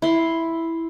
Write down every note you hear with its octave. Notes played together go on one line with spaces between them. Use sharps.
E4 C6